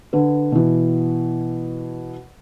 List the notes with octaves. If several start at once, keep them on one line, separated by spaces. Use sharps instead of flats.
D3 B4
B2 E3